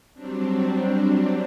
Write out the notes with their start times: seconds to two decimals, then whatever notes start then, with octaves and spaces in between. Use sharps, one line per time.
0.13 F#3 G3 C4 D4